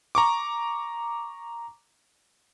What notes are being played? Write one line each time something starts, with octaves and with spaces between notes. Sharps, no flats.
A#5 C#6 D6